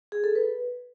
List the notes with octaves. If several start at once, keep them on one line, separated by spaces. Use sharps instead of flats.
G#4
A4
B4